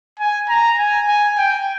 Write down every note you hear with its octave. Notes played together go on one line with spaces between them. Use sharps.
G#5
A#5
G#5
G#5
G5